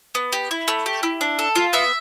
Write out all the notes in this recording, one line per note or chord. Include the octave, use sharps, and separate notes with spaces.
B3
G4
E4
A3
G4
E4
D4
A4
F4
B3 E5